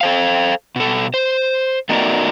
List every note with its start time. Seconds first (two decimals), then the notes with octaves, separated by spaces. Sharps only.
0.01 A4 C5 F5
0.76 B2 A4
1.14 C5
1.89 A3 B3 D#4 F#4 A#4 D5